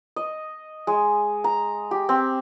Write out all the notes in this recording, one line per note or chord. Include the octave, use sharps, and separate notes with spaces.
D#5
G#3
A#5
G4
C4